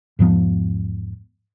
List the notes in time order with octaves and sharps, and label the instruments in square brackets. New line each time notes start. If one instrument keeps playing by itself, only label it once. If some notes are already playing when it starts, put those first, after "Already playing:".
[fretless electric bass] E2 G#2 F3 B3